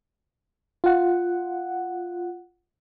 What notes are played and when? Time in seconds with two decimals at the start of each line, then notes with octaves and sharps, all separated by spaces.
0.84 F4 F#5